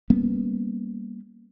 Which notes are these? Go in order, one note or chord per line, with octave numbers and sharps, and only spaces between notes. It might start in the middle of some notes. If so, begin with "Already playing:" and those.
G3 A#3 B3 C#4